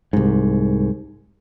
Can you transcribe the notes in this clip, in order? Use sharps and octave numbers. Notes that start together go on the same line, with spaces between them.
C2 G#2